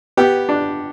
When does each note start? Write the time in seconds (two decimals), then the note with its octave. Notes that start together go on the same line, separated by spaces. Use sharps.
0.17 B3 G4
0.49 D4